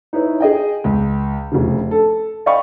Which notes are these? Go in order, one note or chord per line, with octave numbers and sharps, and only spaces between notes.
D#4 E4 B4 C#5
G#4 D#5 G5
C#2
F1 C#3
A4
D5 D#5 F5 G5 B5 C#6